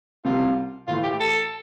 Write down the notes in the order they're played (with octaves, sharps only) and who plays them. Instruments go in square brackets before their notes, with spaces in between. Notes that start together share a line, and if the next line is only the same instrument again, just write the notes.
[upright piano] C2 C3 G3 [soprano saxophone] F4
[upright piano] A2 E3 A3 [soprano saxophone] F4
[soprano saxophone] G4
A4